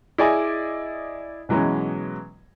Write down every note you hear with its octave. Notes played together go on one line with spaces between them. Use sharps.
E4 G#4 D5 D#5 G#5 D6
B2 E3 F#3 G#3 C#4